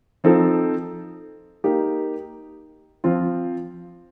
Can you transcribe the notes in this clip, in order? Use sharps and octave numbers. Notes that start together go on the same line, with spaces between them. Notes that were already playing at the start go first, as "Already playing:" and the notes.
F3 C4 D#4 A4
A#3 D#4 G4
F3 C4 F4